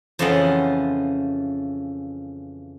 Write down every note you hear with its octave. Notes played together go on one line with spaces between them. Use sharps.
F2 C#3 E3 F4 D#5 F#5